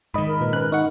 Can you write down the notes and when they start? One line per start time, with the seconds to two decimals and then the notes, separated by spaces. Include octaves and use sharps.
0.14 G#2 D#3 D#5 B5
0.27 A#4
0.41 A#2 B4
0.53 C#4 B4 F#6
0.72 D#4 F#5 C#6